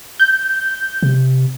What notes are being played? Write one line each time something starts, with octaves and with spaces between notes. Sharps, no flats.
G6
C3